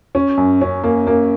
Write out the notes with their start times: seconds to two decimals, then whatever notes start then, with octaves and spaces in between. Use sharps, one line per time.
0.15 C#4
0.37 F#2
0.61 C#4
0.84 A#3
1.07 A#3